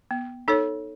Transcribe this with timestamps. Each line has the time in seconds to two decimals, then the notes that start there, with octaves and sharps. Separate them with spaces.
0.11 B3
0.48 D#4 A4 C#5